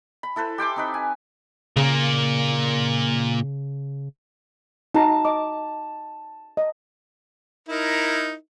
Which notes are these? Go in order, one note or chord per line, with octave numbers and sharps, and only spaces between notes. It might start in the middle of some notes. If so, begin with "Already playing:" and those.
B5
E4 A4 B4 C5
G4 G5 C6 D6
C4 D#4 B4
G#5
A#2 C#3 A#3
D#4 F#4 A5 A#5
D#5 D6
D#5
D#4 E4 A#4